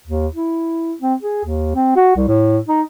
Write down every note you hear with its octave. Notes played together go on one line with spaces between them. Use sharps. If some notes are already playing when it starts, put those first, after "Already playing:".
D#2
E4
C4
G#4
D#2
C4
F#4
C2
A2
D#4